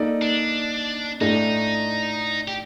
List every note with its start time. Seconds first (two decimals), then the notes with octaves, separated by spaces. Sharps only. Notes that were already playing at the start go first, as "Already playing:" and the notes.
Already playing: A#3 D#4 A4 D5
0.22 D4
1.21 A2 A3 D4 D#4
2.48 G4